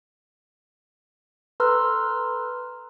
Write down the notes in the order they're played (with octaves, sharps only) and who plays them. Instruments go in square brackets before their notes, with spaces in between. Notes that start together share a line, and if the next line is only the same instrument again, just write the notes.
[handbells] A4 B4 A#5 C6 E6 F6